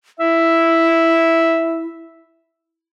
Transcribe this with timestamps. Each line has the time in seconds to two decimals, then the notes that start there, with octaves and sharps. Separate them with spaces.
0.19 E4 E5